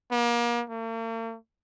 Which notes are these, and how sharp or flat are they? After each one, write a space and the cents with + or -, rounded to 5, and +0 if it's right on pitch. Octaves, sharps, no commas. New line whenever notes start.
A#3 +35
A#3 -45